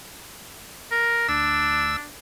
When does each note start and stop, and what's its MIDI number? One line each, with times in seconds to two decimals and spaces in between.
0.91 1.26 70
1.28 1.96 38
1.28 2.08 62
1.28 1.96 88